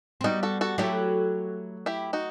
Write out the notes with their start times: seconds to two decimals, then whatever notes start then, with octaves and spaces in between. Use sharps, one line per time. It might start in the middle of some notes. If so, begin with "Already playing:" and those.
0.21 C4
0.24 G3 B3 D#4 F#4
0.43 F#4 A4
0.61 F#4 A4
0.78 F#3 A3 E4 G4
1.86 E4 G4
2.13 D#4 F#4